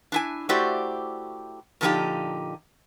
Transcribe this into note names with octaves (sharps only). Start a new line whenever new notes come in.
D4 E4 G#5
A3 E4 F#4 G4 C5 D5
A#2 D3 F3 A3 D#4 G4